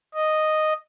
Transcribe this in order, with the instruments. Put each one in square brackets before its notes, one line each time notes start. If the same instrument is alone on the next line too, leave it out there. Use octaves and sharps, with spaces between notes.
[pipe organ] D#5